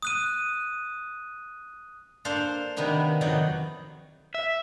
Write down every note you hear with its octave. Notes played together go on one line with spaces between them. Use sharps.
D#6 F#6 D#7
A#3 D4 A4 C5 F5
C3 D#3 A#3 B3 D4
F2 D#3 F#3 D#4 D5
E5